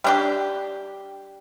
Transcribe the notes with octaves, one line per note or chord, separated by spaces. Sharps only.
G3 D4 G4